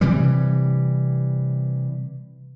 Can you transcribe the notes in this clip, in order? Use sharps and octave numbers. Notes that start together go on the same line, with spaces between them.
C3 E3 G3